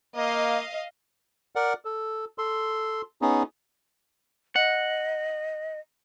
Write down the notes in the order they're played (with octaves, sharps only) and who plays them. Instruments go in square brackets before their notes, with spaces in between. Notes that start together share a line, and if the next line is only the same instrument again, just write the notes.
[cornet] A#3 [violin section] D#5 F5
[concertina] A#4 D5 F#5
A4
A4 C6
B3 C#4 D#4 G#4
[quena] D#5 [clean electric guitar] F#5